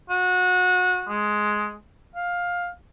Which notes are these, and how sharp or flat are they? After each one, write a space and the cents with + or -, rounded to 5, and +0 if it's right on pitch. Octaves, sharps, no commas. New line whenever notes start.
F#4 -25
G#3 +10
F5 +15